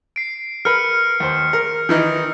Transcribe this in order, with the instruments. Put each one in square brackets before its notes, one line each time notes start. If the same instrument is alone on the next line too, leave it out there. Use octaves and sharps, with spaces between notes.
[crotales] C7 D7
[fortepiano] A#4 B4 [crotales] F6 C#7
[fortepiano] D#2 C5
A#4
D#3 E3 D#4